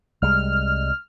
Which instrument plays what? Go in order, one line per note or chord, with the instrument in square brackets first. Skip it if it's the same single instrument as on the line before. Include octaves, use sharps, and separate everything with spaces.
[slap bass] C2 G3 G#3 [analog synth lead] F6